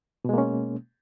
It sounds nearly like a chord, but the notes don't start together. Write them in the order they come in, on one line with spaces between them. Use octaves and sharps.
B2 G#3 A#3 C#4